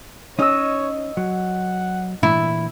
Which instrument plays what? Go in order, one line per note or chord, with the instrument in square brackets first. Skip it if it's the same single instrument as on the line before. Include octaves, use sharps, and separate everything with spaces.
[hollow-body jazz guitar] C#4 D#4 [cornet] C#5 [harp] D#5 D#6 E6
[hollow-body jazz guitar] F#3 [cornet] F#5
[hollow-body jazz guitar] A#2 E3 [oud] E4